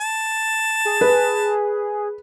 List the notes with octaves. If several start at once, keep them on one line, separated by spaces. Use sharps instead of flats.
A5
G#4
B4